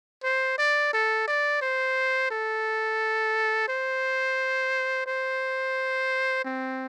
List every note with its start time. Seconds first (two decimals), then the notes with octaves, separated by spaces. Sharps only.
0.24 C5
0.58 D5
0.93 A4
1.28 D5
1.62 C5
2.31 A4
3.69 C5
5.07 C5
6.45 C4